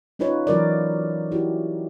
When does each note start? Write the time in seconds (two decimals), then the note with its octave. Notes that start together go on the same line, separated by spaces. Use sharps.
0.19 C#4 D#4 F4 B4 C#5
0.47 E3 F#3 A#4 D5
1.32 E4 F#4 G4